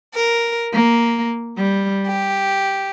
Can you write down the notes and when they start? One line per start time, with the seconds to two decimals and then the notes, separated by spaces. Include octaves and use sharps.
0.14 A#4
0.73 A#3
1.58 G3
2.06 G4